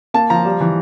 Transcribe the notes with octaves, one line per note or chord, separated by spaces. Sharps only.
A#3 A5
F3 A#5
G3
E3